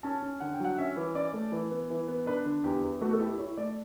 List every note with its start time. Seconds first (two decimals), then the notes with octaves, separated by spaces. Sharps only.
0.03 C#4 A5
0.22 C#4
0.40 D3 F#5
0.54 G5
0.60 F#3 F#5
0.78 C#4 E5
0.96 E3
1.15 C#4 D5
1.33 A3
1.52 E3
1.71 B3
1.90 E3
2.08 B3
2.26 D4 B4
2.46 D3
2.64 E2 G4
2.83 E2
3.01 A3 F#4
3.13 A4
3.20 E4 G4
3.38 E4 C#5
3.57 A3 D5